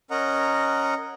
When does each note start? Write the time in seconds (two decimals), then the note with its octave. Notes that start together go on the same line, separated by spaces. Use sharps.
0.11 C#4 A#4 D#5 F#5 A#5